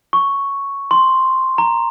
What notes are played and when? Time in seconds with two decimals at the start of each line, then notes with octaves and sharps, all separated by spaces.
0.13 C#6
0.91 C6
1.58 A#5